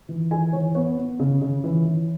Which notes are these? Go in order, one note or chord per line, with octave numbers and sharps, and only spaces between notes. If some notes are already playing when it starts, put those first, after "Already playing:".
E3
E3 G#4 G#5
E3 C#5
B3 C#5
B3
C#3
C#3
E3
E3